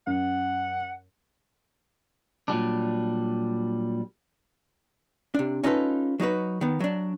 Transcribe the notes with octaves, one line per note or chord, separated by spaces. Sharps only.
F#2 F#5
A#2 F#3 G3 D4
C3 D4
C#4 D#4 F4 A4 B4
F#3 D#4 F#4 B4
D#3 B3
F#3 D4